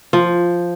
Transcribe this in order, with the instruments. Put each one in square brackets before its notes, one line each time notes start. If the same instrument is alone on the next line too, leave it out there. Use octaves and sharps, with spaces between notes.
[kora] F3